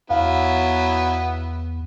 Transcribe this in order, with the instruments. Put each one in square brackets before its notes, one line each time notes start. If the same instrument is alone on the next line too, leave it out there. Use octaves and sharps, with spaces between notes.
[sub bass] E2 [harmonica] F#3 B3 E4 [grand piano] F5